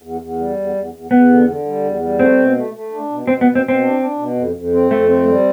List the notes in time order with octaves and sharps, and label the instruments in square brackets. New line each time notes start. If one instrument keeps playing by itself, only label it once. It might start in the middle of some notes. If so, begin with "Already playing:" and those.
[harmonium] E2
E2
G3
E2
E2
E2
[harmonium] E2 [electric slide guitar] B3
[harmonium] D3
D3
G3
E2
G3
[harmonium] A3 [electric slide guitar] C4
[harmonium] B2
A3
A3
D4
B2
[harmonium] B2 [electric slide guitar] C4
[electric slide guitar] B3
[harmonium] B2
[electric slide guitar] C4
[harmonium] B2
[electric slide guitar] C4
[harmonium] D4
D4
B2
F2
F2
C4
[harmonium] F2 [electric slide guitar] A3
[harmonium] C4
G3